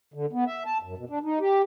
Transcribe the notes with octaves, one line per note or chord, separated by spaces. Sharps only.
D3
B3
E5
A5
F#2
B2
D4
D#4
G4